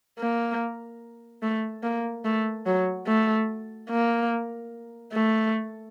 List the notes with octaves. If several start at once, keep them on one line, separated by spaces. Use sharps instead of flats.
A#3
A3
A#3
A3
F#3
A3
A#3
A3